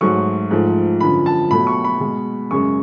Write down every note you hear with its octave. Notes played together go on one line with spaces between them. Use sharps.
G#2 F#3 A3 C#6
G#2 F3 A3
F#2 D3 F3 B5
A5
B2 F#3 A3 B5
C#6
B5
B2 G#3
F#2 C#3 G#3 C#6